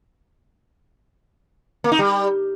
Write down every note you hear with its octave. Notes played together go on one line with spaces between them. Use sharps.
A#3
D#4
G3